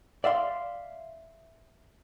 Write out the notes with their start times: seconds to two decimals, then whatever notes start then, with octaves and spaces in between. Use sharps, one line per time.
0.24 D5 E5 F5 C6